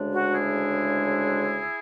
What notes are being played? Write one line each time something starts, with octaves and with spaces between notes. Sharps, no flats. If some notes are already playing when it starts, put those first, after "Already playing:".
Already playing: D2 C#3 G#3 D4
F#4
E4 G#4